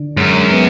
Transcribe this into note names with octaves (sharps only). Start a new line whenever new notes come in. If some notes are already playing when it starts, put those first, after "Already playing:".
Already playing: D3
F#2 G#3
B3